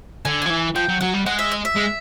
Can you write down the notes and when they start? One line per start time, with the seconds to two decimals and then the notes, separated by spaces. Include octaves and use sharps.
0.25 D3 G#5
0.42 F3 G#5
0.50 E3
0.75 F3 G5
0.88 F#3
1.01 F#3 F#5
1.14 G3
1.26 G#3 F#5
1.39 E5
1.52 D#5
1.65 E5
1.76 G#3